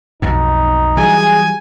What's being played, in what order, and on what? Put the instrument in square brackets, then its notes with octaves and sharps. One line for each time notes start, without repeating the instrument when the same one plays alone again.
[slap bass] B1 F2 G#2 [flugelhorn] D#4
[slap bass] E3 F#3 G3 [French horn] G#4 [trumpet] G#5